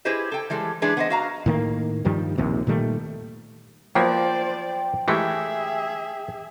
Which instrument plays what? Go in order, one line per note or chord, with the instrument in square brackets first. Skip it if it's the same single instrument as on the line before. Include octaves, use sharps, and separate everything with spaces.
[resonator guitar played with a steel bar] E4 G4 G#4 B4 C5 D#5
A4 G5
E3 G3 G#3 A4
E3 G#3 D4 G#4 B4
B3 C5 D#5
F#4 F5 A#5
[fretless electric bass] A2 D#3 A#3
G2 D#3 F3 G3
A#1 D#2 C3
A#2 D#3 G3 A3
[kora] F3 [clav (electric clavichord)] F#3 A#3 B3 [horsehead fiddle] C5 D5 [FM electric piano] G5
[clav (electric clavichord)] E3 G#3 A3 [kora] G4 [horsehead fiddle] G#4 E5